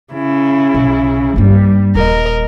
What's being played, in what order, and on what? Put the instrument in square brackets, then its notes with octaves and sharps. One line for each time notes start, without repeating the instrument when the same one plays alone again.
[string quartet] C#3 E4
[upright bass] B1
[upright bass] G2 A#3 [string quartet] G3
[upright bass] D#1 [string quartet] A#4 D#5